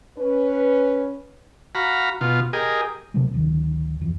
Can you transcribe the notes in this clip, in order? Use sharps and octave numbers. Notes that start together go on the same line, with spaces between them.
C#4 B4
F#4 F5 A#5 B5
B2 F4
G4 G#4 A#4 D#5
C3 F#3 G#3
D1 G#1 D#3
F2 E3